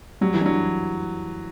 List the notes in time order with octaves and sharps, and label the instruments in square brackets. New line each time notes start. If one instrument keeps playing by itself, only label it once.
[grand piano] F#3 [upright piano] G3
[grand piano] E3
[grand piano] F#3 [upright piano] D4